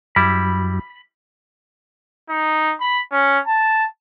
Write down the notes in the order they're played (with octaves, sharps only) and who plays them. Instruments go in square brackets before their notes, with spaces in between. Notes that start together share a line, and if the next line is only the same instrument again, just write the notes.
[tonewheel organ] F#2 [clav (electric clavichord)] G3 E4 [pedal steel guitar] B5
[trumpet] D#4
B5
C#4
A5